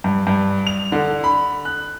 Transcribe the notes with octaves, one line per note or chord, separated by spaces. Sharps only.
G2
G2
F7
D3
B5
F#6